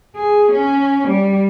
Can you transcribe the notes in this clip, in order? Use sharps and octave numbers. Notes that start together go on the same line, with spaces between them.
G#4
C#4
G3